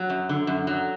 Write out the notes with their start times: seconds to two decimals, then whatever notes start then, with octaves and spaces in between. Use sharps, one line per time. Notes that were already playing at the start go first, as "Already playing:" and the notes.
Already playing: F#3
0.09 F#2
0.29 D3
0.47 F#2
0.67 F#3